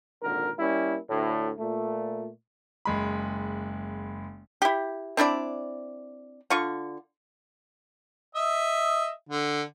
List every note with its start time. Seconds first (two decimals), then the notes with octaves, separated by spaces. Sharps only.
0.23 G#1 A#2 D3 A#4
0.59 G3 A#3 C#4 E4
1.09 D2 A2
1.59 A#2 A3
2.85 F#1 G#3 B5
4.62 E4 G4
5.17 C4 D4 E4 D5
6.50 D3 F4 C#6
8.35 D#5 E5
9.29 D3